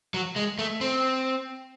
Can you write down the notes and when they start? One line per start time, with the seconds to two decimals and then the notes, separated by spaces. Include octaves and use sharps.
0.14 F#3
0.36 G#3
0.59 A3
0.81 C4